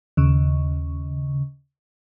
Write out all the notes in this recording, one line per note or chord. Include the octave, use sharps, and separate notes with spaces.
D#2 C#3